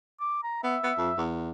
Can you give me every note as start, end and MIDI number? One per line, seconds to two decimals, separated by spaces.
0.20 0.39 86
0.43 0.60 82
0.64 0.76 59
0.64 1.22 76
0.83 0.92 59
0.97 1.11 41
1.18 1.51 40